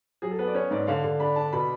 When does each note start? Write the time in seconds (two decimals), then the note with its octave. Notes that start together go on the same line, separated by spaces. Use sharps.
0.22 F#3 G#4
0.31 A4
0.39 B3 B4
0.48 D5
0.55 C#4 C#5
0.71 G#2 D5
0.87 D3 F5
1.04 D3
1.20 D4 B5
1.36 D4 A5
1.53 B2 B5